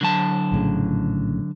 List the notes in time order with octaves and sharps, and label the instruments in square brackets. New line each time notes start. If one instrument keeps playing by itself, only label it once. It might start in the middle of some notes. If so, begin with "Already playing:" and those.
[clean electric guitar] D3 F#3 A5
[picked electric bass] A#1 A2 C#3